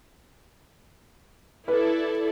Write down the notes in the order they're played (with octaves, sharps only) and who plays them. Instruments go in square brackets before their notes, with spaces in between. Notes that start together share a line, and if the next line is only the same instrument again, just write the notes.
[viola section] E4 A4 D5 [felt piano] B4